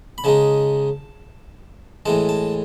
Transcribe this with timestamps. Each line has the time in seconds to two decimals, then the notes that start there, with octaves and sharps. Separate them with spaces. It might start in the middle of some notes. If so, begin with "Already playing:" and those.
0.18 B5
0.24 C#3 G#3 D#4 A5
2.06 A2 E3 G#3 A5
2.29 A5